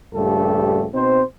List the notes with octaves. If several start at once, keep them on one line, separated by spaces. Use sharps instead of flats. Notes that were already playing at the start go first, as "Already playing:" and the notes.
A#1 G2 C#3 A3 G4 A4
B2 C4 D#4 C5